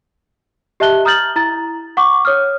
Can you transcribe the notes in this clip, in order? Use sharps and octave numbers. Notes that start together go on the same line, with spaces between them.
G4 D#5 E5 A5 F#6 G7
A#5 D#6 F6 G6 A6 F#7
E4 A#5 A6
F#5 C#6 D6
C#5 D#6 F6